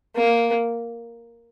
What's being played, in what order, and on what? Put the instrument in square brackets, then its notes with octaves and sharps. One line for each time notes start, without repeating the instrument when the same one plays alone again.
[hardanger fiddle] A#3